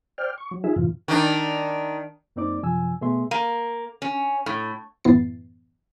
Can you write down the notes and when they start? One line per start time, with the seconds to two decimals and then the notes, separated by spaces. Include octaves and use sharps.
0.18 C5 D5 G5 F6
0.38 C#6
0.51 F#3
0.64 D#4 F4 G#4 E5
0.76 F#2 A2 C3 E3 F4
1.08 D#3 D4
2.36 F#2 A#3 C4 D#4 D5 D6
2.62 F#2 C3 F3 G#5 E6
3.01 B2 A3 B3 G#4 E5 C6
3.31 A#3
4.02 C#4
4.46 A2
5.04 A1 F#2 B3 E4 A6 C7